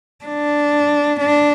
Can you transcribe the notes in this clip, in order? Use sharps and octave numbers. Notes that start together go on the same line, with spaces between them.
D4
D4